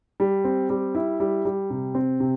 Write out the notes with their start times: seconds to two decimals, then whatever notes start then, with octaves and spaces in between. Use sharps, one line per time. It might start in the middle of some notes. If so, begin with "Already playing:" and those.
0.20 G3
0.44 C4
0.70 G3
0.95 E4
1.20 G3
1.45 G3
1.70 C3
1.95 C4
2.20 C3